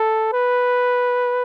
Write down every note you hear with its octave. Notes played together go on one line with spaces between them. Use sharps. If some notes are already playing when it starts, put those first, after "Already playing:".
Already playing: A4
B4